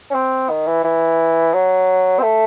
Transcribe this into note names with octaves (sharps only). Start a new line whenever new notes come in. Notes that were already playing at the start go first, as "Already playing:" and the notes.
C#4
C4
D#3
E3
E3
F#3
C4
A3